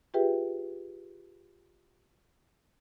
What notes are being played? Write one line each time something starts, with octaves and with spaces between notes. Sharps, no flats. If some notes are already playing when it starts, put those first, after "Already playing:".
F4 G4 G#4 B4 E5 G5